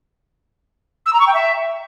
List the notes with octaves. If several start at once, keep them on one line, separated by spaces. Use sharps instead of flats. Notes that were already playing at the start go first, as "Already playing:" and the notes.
E6
A#5
C#6
G5
E5